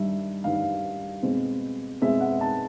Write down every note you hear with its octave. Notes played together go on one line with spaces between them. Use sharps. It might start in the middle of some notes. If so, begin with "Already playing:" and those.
Already playing: G2 D#3 G3 E5
G2 D#3 G3 F5
B2 G#3 C4
B2 G#3 C4 E5
F#5
A5